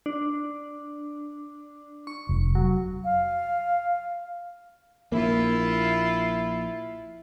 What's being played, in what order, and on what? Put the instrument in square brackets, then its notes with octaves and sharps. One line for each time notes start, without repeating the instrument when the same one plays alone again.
[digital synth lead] D4
C#6
[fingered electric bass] F1
[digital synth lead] F#3
[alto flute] F5
[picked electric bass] A#1 A#3 [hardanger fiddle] E4 F4